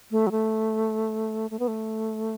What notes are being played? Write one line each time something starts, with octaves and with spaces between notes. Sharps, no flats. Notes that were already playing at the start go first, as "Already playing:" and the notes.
A3
F#3
A3
A3
B3
A3